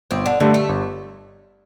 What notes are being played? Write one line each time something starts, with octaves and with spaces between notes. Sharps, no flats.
G1 C4
D3
G2 D3 G3 A3
A3
G1